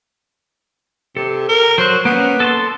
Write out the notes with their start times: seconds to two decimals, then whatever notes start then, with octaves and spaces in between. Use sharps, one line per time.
1.17 C3 A4
1.49 A#4
1.78 F#3 C5 F#6
2.05 A#3 B3 C#4
2.40 A4 A5 C6